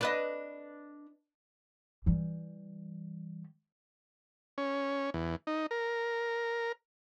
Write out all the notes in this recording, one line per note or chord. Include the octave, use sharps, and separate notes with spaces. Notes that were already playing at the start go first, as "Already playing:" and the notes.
D4 B4 D#5
E3 G3
C#4
E2
D#4
A#4